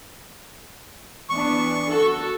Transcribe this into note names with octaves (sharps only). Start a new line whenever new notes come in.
E3 B3 D4 C#6
F#4 A4